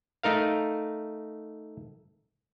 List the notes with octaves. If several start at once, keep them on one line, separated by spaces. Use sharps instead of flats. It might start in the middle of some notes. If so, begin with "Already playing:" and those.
A3 D#4 A#4 F5